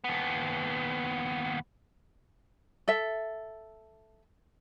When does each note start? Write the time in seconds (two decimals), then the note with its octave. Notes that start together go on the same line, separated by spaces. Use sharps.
0.04 D#2 B3
2.88 A4 E5